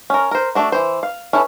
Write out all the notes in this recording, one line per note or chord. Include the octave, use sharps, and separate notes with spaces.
C#4 A#4
A#4 C5
A3 D4 F#4
E3 C5
F5
C#4 E4 A4 B4